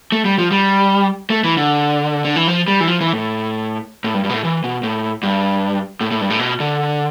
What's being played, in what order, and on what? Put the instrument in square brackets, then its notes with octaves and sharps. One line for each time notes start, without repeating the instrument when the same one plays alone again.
[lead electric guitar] A3
G3
F3
G3
A3
E3
D3
D3
E3
F3
G3
E3
F3
E3
A2
A2
G2
G2
B2
A2
E3
B2
A2
G2
A2
A2
G2
A2
B2
D3